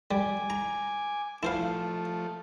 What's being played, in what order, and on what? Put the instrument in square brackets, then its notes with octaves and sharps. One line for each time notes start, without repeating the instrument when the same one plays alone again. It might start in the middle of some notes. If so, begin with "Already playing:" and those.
[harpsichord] G3 [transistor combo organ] G#5 D6
[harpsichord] A#5
[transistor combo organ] F3 A3 [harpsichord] E4 C5 F5